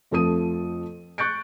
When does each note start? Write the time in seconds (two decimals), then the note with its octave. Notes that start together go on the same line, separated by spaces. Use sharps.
0.11 F2 F3 A3 A4 D#6 D#7
1.18 C#6 F#6 G6 A6 C#7 D7